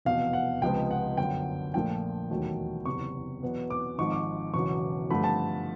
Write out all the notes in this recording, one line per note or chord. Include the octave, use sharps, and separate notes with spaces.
F1 E2 B2 F5
F#5
C#2 C3 F3 G#3 B3 G5
F#5
G1 F#2 D3 G5
A#1 A#2 F3 A3 G5
E1 D#2 D#3 F#3 A3
F#1 E2 C3 C#6
E2 B2 F#3 B3
D6
G#1 G#2 F3 G#3 C#6
D6
E1 E2 C#3 F#3 C#6
G2 D3 F3 A3 B5
A5